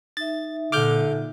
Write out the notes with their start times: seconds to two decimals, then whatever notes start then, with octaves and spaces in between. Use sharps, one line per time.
0.17 D#4 E5 A6
0.72 A#2 D3 D6 F6 G6